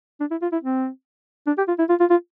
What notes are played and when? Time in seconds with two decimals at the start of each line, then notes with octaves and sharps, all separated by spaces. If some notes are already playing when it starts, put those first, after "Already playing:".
0.21 D4
0.31 E4
0.42 F4
0.52 E4
0.63 C4
1.47 D4
1.58 G4
1.68 F4
1.79 E4
1.90 F4
2.00 F4
2.10 F4